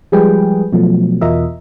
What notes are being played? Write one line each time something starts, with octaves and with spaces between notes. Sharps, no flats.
F3 G3 G#3 G#4 B4 G5
B2 F3 F#3 A3
E2 B2 F4 A#4 D#5 E5